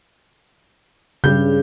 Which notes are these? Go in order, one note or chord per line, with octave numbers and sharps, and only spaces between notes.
G2 C#3 G6